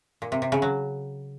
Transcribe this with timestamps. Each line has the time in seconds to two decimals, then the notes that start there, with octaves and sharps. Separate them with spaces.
0.22 A#2
0.32 C3
0.42 C3
0.52 C#3
0.62 F#3